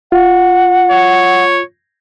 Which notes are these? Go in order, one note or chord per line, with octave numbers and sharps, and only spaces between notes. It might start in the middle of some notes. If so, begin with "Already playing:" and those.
F4 F#5
C#5